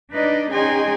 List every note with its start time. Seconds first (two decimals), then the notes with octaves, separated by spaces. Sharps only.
0.12 D4 D#4 B4 D5 D#5
0.52 C#4 D#4 G#4 G5 G#5 C6